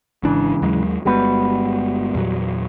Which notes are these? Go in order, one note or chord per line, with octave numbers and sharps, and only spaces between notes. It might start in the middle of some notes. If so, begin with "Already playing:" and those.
G#1 G#2 C#3 E3 D4
D#2 F#3 G#3
G1 G3 G#3 B3 F#4 B4
E2 A#2 F#3